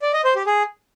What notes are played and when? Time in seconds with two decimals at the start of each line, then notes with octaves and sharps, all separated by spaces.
0.02 D5
0.13 D#5
0.24 C5
0.35 G4
0.47 G#4